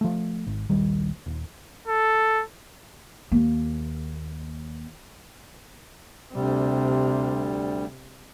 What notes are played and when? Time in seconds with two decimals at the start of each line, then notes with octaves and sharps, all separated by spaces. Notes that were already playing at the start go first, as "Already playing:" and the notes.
0.01 F3 A3
0.47 G#1
0.69 A#1 D#2 G3
1.26 D#1
1.87 A4
3.32 D#2 A#3
6.33 D2 C3 G3